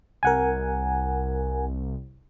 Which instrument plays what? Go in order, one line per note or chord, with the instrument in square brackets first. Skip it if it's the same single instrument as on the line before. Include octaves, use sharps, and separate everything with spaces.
[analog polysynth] C2 [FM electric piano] A#4 F#5 G#5